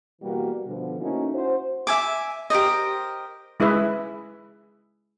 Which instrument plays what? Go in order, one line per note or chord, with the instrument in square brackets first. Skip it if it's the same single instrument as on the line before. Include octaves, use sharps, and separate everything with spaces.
[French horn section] B2 E3 G3 A#3 F#4
B2 D3 F3
A3 A#3 C#4 D#4 E4 F#4
C#4 E4 F#4 C5
[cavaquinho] E5 G#5 D6
G4 A#4 C5 D#5
[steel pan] G#3 E4 G#4 B4 E5